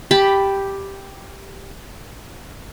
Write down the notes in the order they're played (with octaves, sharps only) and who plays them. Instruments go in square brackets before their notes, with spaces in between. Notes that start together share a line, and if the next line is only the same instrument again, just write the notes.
[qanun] G4 A5 B5